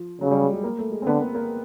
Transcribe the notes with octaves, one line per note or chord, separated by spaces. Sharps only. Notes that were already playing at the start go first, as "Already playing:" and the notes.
Already playing: F3
C#3 F#3
G3
G#3
G#3
A#3
A3
G#3
C4
D3 B3
A#3
A#3